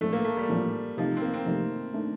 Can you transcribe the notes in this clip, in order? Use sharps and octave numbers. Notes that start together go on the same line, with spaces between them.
A#1 A2 F3 A3
A#3
A3
G3
A#1 A2 F3
F2 C3 D#3 F3 A3 D#4
C4
A#3
C4
F2 C3 D#3 A3 D#4
D#3 A3 D4